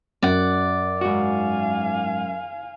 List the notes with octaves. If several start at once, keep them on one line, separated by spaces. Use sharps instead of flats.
F#2 D5 F#5
G#2 F#4 F5 G#5